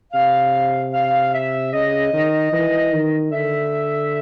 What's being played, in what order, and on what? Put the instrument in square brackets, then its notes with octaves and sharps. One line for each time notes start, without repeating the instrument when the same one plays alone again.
[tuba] C3 [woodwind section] F5
[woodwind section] F5
E5
[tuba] C#3 [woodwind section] D#5
[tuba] D#3
E3
D#3
[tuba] D3 [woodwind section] E5